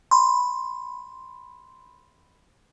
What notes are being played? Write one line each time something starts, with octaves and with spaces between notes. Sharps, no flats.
B5 C6